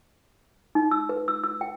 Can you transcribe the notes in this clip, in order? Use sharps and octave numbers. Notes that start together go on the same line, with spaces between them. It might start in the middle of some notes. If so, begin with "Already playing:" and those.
D#4
E6
B4
E6
E6
G5